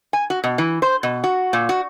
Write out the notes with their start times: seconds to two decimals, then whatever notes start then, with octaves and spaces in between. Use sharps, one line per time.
0.13 G#5
0.30 F#4
0.44 B2
0.58 E3
0.82 C5
1.03 B2
1.24 F#4
1.53 A#2
1.69 F#4